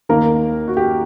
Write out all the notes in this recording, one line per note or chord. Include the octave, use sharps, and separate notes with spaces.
D#2 D#3 A#3 A#4
F#4
G4